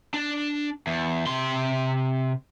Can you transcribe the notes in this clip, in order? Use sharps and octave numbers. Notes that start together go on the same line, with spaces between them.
D4
E2
C3 C6